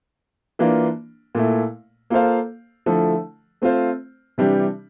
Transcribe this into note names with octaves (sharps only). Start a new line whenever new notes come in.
E3 A#3 D4 F4
A#2 A3 E4
A#3 F4 A4 C5 F5
D3 F3 A3 E4 A4
A3 C4 F4 C5
C3 E3 G3 D4 G4